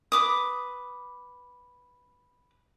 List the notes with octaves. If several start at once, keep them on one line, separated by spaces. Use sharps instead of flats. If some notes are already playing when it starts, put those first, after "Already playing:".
B4 D6 D#6